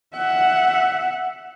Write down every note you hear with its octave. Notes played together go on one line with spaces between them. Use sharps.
E5 F#5